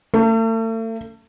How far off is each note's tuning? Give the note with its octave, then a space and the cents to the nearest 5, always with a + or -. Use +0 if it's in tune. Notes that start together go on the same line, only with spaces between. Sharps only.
A3 +40